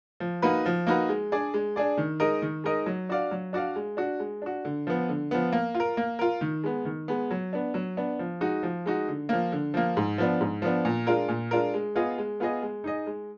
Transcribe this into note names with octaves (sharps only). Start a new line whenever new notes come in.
F3
A#3 D#4 F#4 B4
F3
A#3 D#4 F#4 B4
G#3
D4 G#4 D5
G#3
D4 G#4 D5
D#3
G#3 D#4 A#4 D#5
D#3
G#3 D#4 A#4 D#5
F#3
D4 F#4 D5 F5
F#3
D4 F#4 D5 F5
G#3
D4 F#4
G#3
D4 F#4
D3
F3 B3
D3
F3 B3
A#3
F4
A#4
A#3
F4 A#4
D#3
G#3 B3
D#3
G#3 B3
F#3
B3 D4
F#3
B3 D4
F3
G#3 D#4 F#4
F3
G#3 D#4 F#4
D3
F3 A#3
D3
F3 A#3
G#2
F3 B3 D4
G#2
F3 B3 D4
A#2
G#3 D4 F4 A#4
A#2
G#3 D4 F4 A#4
G#3
B3 F4 G#4 D#5
G#3
B3 F4 G#4 D#5
G#3
D#4 G#4 D#5
G#3